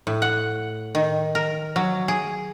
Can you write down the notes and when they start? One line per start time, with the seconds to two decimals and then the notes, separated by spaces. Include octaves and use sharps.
0.07 A2
0.22 F#5
0.95 D#3
1.35 A#4
1.76 F#3
2.08 G#4